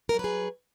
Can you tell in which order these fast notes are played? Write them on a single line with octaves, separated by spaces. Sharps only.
A#4 F#3 B4 G#4